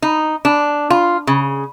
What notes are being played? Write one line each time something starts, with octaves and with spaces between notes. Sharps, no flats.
D#4
D4
F4
C#3